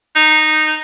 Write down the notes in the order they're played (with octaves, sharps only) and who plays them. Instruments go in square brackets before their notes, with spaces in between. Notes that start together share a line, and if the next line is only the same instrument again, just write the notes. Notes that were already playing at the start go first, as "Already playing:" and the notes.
[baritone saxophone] D#4